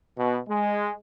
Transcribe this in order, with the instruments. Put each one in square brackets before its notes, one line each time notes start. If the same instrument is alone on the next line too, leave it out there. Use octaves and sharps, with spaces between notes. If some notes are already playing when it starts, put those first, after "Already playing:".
[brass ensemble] B2
G#3